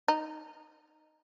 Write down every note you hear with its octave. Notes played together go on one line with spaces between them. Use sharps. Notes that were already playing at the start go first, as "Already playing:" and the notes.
D#4